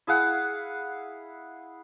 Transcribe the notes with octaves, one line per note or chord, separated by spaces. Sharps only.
E4 G#4 F5 F#5